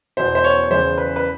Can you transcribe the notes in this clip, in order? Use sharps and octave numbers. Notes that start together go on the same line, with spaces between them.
E2 B2 C5
C5
C#5
E2 C#3 E3 C5
B4
B4